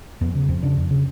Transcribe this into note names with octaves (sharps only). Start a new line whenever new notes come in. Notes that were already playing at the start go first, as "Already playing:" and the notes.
F2 B3
C#3
F2 C4
C#3 D4
F2
C#3